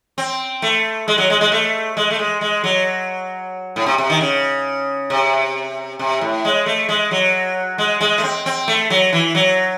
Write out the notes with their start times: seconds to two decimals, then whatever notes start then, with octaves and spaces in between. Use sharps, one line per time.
0.18 C4
0.62 A3
1.08 G#3
1.18 F#3
1.30 G#3
1.41 G#3
1.52 A3
1.97 G#3
2.11 A3
2.19 G#3
2.41 G#3
2.64 F#3
3.76 A2
3.86 C3
3.98 C3
4.10 D#3
4.21 C#3
5.10 C3
5.99 C3
6.21 A2
6.45 G#3
6.66 A3
6.89 G#3
7.11 F#3
7.78 G#3
8.01 G#3
8.18 A3
8.23 C4
8.46 C4
8.68 A3
8.90 F#3
9.13 E3
9.35 F#3